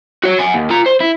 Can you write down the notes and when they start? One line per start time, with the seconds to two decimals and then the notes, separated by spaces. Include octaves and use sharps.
0.24 F#4 C#5
0.39 F#5 G#5
0.54 D#2
0.70 F4 A#5
0.86 C5
1.00 E4